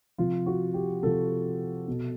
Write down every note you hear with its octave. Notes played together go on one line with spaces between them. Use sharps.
C3 F3 F4
F#4
G4
C3 F3 A4
B2